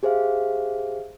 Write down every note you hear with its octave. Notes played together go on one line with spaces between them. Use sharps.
G4 G#4 C5 E5 F5